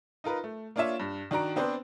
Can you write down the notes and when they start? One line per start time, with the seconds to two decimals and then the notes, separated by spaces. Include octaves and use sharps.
0.24 D#4 F4 A#4 B4
0.44 A3
0.76 A#3 D4 F4 C#5 E5 E7
1.00 G2
1.31 D#3 D4 F#4 A#5 D7
1.56 B3 C4 D4 B4 C5